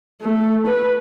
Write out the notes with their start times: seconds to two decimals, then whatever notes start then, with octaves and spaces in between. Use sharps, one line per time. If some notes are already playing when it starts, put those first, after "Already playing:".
0.22 A3
0.67 B4